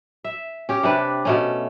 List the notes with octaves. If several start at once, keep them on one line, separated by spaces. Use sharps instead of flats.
E5
C#4 G4
C3 D4 B4
B2 A3 C#4